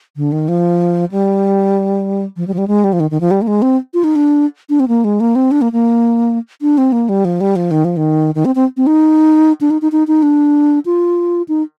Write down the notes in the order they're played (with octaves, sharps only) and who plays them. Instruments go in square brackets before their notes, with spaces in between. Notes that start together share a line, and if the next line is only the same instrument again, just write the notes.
[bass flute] D3
D#3
F3
G3
F3
G3
F3
G3
G#3
G3
F3
D#3
D#3
F3
G3
A#3
G#3
C4
F4
D#4
D4
D4
C4
A#3
G#3
A#3
C4
D4
A#3
A#3
D4
C4
A#3
G3
F3
G3
F3
D#3
F3
D#3
D#3
C4
C4
C4
D#4
D4
D#4
D#4
D#4
D#4
D4
F4
D#4